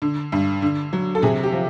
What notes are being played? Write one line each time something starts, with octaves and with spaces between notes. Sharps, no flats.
D3
G2
D3
F#3
A4
C3 G#4
G4
F3